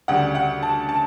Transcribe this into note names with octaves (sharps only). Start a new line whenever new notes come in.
D2 C#3 G3 F#5
F#5
A5
A5